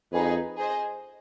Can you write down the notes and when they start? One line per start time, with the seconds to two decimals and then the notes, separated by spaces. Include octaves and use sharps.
0.12 F2 D#4 G#4 B4
0.57 G#4 C5 D#5